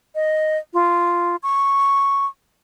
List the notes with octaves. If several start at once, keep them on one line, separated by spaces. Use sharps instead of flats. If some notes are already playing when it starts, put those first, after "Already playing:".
D#5
F4
C#6